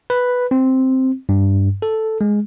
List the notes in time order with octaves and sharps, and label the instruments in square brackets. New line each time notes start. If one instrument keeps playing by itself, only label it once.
[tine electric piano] B4
C4
G2
A4
G#3